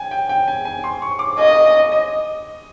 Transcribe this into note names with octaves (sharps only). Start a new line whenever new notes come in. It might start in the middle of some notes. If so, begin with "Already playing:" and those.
Already playing: G5 G#5
G5
G5
G#5
G#5
C6
C#6
D6
D#5 G#5
D#5